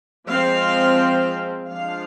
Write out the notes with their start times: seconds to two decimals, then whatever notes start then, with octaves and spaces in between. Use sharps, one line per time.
0.28 F3 G#3 C4 F5
1.69 F3 G#3 D4 F5